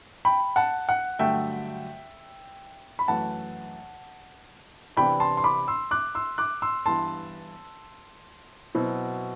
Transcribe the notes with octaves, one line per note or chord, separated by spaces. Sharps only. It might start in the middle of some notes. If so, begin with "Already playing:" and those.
G5 B5
F#5 A5
F#5
G2 D3 F#3 A3 E5 G5
B5
F#2 E3 A3 F#5 A5
C3 E3 B3 D4 G5 B5
A5 C6
C6
B5 D6
C6 E6
D6 F#6
C6 E6
D6 F#6
C6 E6
G2 E3 B3 E4 A5 C6
B2 F#3 C4 E4